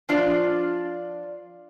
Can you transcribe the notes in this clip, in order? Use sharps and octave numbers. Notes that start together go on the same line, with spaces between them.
F3 D4 F4 D5